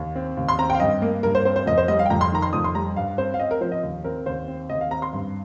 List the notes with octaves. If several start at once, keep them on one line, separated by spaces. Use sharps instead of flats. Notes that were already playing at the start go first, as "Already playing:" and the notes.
Already playing: D#2
C4
D#2
C6
C4 A#5
G5
F5
G2 D#5
A#3
G2 A#4
C5
C4 C5
C5
F2 D#5
C5
G3 D#5
F5
G5
F2 A#5
C6
D#3 A#5
C6
F2 D#6
C6
G3 A#5
G2 F5
C4 C5
F5
C4 D#5
A#4
F3 C5
D#5
D#2
C4 A#4
D#2 C5
C4
D#2 D#5
F5
C4 A#5
C6
G2